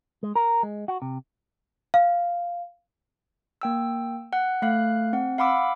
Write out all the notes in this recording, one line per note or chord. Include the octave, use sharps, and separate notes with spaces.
G#3
A#4
G#3
F#4
C3
F5
A#3 G5 E6
F#5 F#6
A3 F5 F#6
C4 F#5
F5 F#5 B5 D6 E6